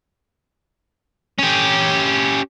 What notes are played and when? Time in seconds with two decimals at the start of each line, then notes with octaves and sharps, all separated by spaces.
1.39 C#4 G4